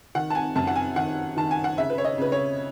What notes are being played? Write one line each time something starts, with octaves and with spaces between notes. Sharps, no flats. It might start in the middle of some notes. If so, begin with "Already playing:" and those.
D#3 F#5
A5
G#5
F#2 A5
F#5
G#5
D#3 F#5
D#3 A5
G#5
F#5
C#3 E5
B4
C#5
D#5
C#3 B4
C#5